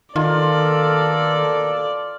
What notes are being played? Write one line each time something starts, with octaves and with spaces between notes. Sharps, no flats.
B2 D#3 A#3 F4 A4 D5